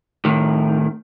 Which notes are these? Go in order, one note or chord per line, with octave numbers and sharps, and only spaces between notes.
A2 D#3